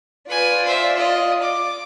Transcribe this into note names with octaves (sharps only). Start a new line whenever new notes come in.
F4 B4 D5 G#5
C5 E5
D#5
D6